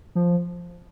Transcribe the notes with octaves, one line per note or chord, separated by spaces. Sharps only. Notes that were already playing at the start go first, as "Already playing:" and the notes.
F3